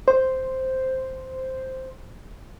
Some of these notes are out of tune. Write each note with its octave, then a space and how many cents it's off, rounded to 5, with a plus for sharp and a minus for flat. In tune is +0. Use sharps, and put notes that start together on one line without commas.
C5 +0